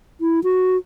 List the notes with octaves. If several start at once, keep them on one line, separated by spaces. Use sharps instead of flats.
E4
F#4